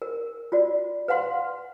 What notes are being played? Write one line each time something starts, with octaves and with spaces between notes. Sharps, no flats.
A#4
F4 F#4 D5
B4 F5 F#5 C6